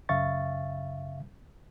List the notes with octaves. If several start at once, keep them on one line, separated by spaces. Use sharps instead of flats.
F#2 C#3 E5 F5 C#6 A6